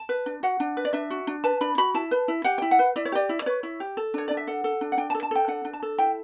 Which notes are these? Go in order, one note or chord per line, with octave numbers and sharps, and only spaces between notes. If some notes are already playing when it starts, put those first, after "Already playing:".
Already playing: A5
B4
D4
F#4 F#5
D4
B4
D5
D4 E5
F#4
D4
B4 A5
D4 B5
F#4 B5
E4 A5
B4
E4
G4 F#5
E4 G5
F#5
B4
E4 D5
C#5
G4 D5
E4
D5
B4 C#5
E4
G4
A4
D4 C#5
D4 D5
E5
A4 F#5
A4
D4
F#5
D4 G5
A5
A4
A5
A4 G5
D4 F#5
D4
A5
A4
E4 G5